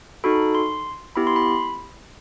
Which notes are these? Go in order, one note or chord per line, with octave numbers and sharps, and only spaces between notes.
D#4 F#4 A4 B5
C6
B3 E4 G4 B5
C6
B5